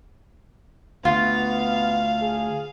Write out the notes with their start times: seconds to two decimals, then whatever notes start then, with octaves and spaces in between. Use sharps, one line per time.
1.05 D2 B3 F4 F5
2.22 G#4